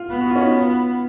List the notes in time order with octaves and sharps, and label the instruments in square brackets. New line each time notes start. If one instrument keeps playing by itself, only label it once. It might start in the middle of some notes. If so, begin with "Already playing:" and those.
Already playing: [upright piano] F4
[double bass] B3
[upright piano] F#4
F4
C#4
D#4
F4